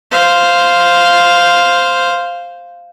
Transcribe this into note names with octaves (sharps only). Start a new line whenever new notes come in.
C5 F5